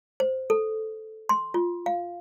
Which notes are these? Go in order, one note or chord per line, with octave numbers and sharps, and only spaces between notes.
C5
A4
C6
F4
F5